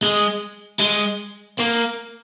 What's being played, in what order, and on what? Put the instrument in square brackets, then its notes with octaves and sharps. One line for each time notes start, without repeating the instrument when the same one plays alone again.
[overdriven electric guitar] G#3
G#3
A#3